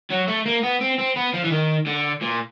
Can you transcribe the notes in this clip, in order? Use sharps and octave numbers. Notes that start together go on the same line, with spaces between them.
F#3
A3
A#3
B3
C4
C4
B3
F3
E3
D#3
D3
A#2